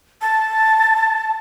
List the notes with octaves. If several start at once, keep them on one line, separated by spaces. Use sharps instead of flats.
A5